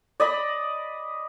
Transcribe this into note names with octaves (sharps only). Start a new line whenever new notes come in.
D5 D#5 B5